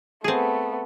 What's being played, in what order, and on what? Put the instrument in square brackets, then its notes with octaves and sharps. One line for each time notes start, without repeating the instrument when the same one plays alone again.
[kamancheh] A3 B3 [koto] C4 G#4